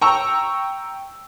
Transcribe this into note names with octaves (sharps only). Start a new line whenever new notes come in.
G5 A#5 C#6 E6